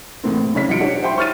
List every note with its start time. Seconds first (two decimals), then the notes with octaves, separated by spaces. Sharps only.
0.23 E2 A2 A3 A#3 C4
0.54 F#1 C#3 C#5 B6
0.68 E1 F#3 D#4 F4 C#7 D7
0.80 D4 F#4 G4 C#5
1.02 C5 E5 G5 C6
1.18 C#6 F6 A6 D#7